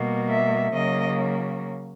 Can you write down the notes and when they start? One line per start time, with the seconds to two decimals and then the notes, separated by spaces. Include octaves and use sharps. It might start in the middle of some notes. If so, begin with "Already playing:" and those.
Already playing: B2 G3 A#3
0.28 E5
0.73 C#3 F#3 A#3 D#5